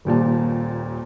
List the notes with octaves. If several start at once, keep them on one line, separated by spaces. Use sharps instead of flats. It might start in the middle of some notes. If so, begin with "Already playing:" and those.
D#1 D#2 A#2 A5